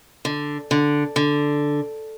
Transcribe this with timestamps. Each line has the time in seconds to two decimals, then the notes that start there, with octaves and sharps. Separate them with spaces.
0.25 D3
0.71 D3
1.16 D3